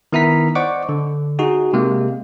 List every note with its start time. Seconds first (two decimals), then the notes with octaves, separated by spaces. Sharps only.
0.13 D#3 B3 E4 E5 A#5 B6
0.55 C5 D5 D#5 F#5 C#6 D6
0.89 D3
1.39 D#4 F#4 G#4
1.73 C3 G#3 A#3